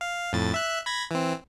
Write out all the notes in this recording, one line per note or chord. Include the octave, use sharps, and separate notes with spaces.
F5
F2 A2 A6
E5 F#6
B5 G#6 A#6
E3 C4